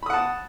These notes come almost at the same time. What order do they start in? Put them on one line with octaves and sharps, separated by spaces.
B5 D#6 F#5 A5